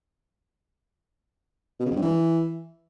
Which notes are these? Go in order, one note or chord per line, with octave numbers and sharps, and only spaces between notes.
B2
C#3
F2
G2
E3